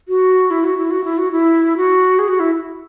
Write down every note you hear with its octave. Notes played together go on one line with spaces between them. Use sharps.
F#4
E4
F#4
E4
F#4
E4
F#4
E4
F#4
G#4
F#4
E4